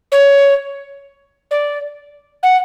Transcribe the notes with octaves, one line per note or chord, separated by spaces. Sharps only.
C#5
D5
F#5